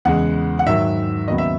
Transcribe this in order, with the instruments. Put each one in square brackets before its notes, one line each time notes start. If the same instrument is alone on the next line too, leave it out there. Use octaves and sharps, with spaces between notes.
[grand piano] E2 C#3 G#3 F#5
F#5
G#2 D#3 F#3 E5
D#2 C#3 F#3 B3 D#5
E5